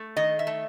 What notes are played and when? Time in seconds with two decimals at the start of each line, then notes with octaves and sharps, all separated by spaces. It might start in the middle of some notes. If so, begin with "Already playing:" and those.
Already playing: A3
0.16 D#3 D#5
0.39 E5
0.47 A3